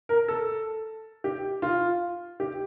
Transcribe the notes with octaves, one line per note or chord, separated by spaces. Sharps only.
A#4
A4
G4
F4
G4